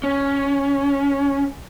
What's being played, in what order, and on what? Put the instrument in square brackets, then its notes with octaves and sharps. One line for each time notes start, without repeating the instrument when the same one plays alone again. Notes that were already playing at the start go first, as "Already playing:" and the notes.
[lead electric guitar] C#4